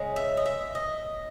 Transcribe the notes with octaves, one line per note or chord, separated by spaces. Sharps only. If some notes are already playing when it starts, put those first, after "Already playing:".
Already playing: C#3 G#3
E5
D#5
E5
D#5